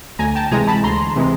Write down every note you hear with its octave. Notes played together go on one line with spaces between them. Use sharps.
D2 G#5 A#5
G5 A5
C3 E3 G#3 G#5 A#5
A5 B5
D2 A#5 C6
C3 E3 G#3